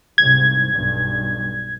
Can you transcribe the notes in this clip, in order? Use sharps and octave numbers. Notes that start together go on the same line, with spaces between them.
C2 G#2 G#6
B1 G2